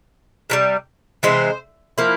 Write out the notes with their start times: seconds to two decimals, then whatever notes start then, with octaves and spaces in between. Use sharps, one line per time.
0.50 C3 E3 G3
1.23 C3 E3 G#3 C5
1.98 F3 A#3 E4